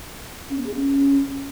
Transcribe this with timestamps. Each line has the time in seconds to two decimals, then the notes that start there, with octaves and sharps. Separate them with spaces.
0.50 C#4
0.58 B3
0.66 G#4
0.74 C#4